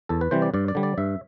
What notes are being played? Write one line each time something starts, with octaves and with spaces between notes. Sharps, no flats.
E2 A4
B4
C3 E3 G3 C5
D5
G2 D5
D5
D3 G3
D5
G2 E5